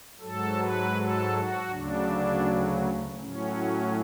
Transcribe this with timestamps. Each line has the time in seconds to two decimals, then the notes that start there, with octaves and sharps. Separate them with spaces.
0.21 G#2 F#3 A4
0.59 B4
0.95 A4
1.33 F#4
1.70 D2 C#3 F#3 D4
3.19 A2 F#3 C#4